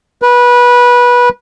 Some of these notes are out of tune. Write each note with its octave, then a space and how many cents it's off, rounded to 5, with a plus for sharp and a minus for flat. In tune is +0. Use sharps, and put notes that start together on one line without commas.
B4 -20